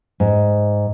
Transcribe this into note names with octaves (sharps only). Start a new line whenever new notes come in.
G#2